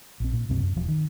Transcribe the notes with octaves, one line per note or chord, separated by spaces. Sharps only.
A#1 C4
A#2
C#2 G2 C3 C4
F#2
E1 F3
D#3